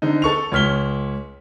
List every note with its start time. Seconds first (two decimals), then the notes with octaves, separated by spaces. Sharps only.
0.02 D3 C4 D#4
0.22 A4 C#6 F7
0.52 C#2 C#5 F6 B6 G7